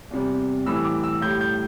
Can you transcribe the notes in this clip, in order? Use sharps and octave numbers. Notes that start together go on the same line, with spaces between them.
E2 C3 G3
A2 E3 G3 E6
D6
E6
A2 G3 G6
G6